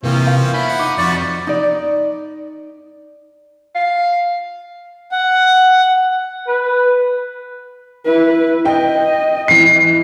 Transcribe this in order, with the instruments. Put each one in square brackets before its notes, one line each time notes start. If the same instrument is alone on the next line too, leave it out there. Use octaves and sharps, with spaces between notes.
[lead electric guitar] C3 [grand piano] E3 A#3 [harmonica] F3 C4 C#4
[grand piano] F5
[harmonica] B3 C#4 [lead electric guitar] D#4 E5 [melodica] B5
[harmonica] F#5
[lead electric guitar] D#4 [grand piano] D6
[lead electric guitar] F2 [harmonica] F3 F#4 C#6 [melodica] D5
[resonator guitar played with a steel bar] D#4 D5
[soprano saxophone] F5
[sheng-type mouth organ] F#5
[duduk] B4
[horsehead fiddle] E4 B4
[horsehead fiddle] D#5 [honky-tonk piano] G5
[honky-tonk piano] E3 C7